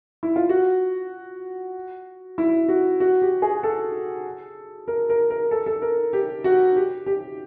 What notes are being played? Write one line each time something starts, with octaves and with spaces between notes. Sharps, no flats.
E4
F4
F#4
E4
F#4
F#4
G4
G#4
A4
A#4
A#4
A#4
A4
A4
A#4
G4
F#4
G4
G4